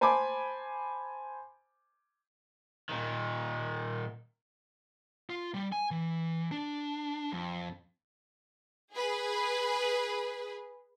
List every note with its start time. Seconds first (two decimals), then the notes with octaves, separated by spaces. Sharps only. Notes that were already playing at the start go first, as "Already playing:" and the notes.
0.01 C5 G#5 A5 B5 D6
2.89 A#2 D#3
5.30 F4
5.54 G3
5.72 G#5
5.91 E3
6.51 D4
7.32 F2
8.92 G#4 B4